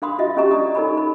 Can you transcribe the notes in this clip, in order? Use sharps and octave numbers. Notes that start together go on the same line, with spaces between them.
D4 A#4 F5 B5 C6 D#6
F4 F#4 D#5 E5
C#4 G4 D#5 G#5 A#5 C#6
D5 D#6
D#4 A4 A#4 C#5 G#5 B5
B5